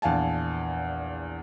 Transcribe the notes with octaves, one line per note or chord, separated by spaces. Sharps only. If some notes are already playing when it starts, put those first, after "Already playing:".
A#1 E2 F5 G#5 A5